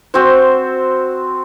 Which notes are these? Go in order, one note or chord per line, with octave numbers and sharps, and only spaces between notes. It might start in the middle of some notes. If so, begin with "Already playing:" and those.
C4 F#4 C5